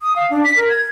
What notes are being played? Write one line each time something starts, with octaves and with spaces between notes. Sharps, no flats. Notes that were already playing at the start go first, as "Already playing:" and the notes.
D#6
F5
D4
B6
A#4
G#6